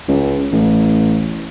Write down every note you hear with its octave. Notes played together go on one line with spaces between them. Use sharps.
C#2
A1